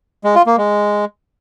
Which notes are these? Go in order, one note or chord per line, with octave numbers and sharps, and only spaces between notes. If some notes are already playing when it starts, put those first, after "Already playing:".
G#3
F4
A#3
G#3